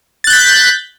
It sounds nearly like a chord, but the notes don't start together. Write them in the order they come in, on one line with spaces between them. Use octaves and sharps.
A6 F#6 G6 B6